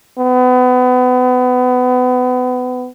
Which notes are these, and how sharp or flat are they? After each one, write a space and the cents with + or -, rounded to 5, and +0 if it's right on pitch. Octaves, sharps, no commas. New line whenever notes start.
B3 +30